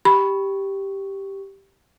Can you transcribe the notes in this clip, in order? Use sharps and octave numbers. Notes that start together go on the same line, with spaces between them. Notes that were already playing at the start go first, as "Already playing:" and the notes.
G4 B5